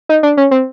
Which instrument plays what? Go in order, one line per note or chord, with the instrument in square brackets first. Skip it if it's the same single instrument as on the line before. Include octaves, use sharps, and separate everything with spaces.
[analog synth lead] D#4
D4
C#4
C4